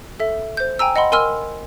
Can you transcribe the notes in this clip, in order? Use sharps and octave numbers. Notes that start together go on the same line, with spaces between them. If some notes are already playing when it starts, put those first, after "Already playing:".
A4 E5
C5 G6
G5 G#5 A#5 E6
D#5 F#5 B5 C6
A#4 G#5 C6 E6 F6